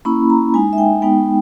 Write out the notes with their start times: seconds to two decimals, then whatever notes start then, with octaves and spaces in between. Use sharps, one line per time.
0.05 A#3 C#4 E4 B5
0.30 A#5
0.54 G#3 D#4 G#5
0.73 E5
0.78 G5
1.02 G#3 B3 D#4 G5